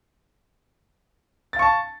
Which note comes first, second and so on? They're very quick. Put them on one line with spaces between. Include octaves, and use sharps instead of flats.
A6 F5 C#6 A5